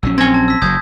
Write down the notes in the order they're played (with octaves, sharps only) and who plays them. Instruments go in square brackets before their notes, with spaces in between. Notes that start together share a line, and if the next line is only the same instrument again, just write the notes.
[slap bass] A#1 F#3 C#4 [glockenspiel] E6
[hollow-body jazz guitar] C4 G#5 [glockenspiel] C6 G#6 A#6
[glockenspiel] A5
E6 B6
[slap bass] F#1 C#3 F#3 [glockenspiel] D#6 G6 G#6